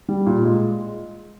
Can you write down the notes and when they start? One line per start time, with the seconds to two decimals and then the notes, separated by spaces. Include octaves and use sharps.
0.09 G3
0.26 A#2
0.43 G#3